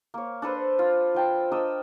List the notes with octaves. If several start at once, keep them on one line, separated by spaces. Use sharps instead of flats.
A#3 C#5
D4 A4 B4 C5
F4
F3 G5 A5
D4 A#4 D#5 E6